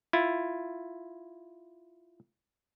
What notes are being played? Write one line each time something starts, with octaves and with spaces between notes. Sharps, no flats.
E4 F4